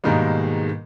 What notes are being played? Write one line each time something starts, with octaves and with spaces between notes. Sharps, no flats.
G#2 B2 D#3 G3 G#3 A#3